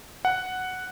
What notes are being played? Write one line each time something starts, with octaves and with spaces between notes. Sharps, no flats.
F#5